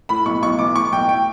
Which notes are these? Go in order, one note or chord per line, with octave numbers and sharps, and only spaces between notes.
A2 B5
B1 C#6
B1 C#6
E3 D6
A2 C#6
B1 G5
G5